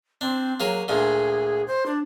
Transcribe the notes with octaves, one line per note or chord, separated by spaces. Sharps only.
C4 D4
F#3 A#3 G#4 C#5
D2 A#2 D3 G#4
C5
D4